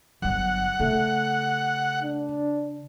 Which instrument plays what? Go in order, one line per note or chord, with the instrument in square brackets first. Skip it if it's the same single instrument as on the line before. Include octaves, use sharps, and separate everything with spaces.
[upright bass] G1 F#3 [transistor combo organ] F#5
[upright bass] C#3 [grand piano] A3
[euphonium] D4